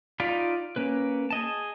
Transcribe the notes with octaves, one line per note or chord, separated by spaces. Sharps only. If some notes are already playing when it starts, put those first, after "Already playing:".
D#4 F4 D5 F5 B5
A#3 C#4 B4
G#4 D#5 A5